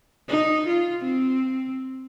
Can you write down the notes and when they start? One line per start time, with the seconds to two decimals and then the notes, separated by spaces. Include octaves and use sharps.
0.28 D#4
0.67 F4
1.04 C4